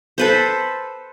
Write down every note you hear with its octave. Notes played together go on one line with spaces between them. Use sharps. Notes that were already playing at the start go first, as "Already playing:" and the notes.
A4 B4 C5